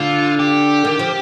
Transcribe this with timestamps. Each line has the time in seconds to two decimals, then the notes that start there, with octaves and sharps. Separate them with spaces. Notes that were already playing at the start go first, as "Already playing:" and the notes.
Already playing: D3 F4
0.39 G4
0.85 D#3
0.99 F3